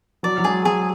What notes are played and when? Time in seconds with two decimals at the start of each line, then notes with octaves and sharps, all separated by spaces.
0.23 F#3 D5
0.38 F#3
0.44 G#3 G#4
0.65 F#3 G#4